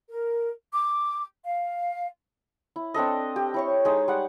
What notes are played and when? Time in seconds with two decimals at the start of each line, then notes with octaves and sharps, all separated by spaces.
0.09 A#4
0.73 D6
1.46 F5
2.76 E4
2.94 C4 D4 A4 D#5
3.36 G4
3.54 E4 C#5 C#6
3.85 G#3 D#4
4.08 G3 F#5